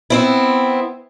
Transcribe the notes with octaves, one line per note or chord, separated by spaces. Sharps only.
B3 C4 E4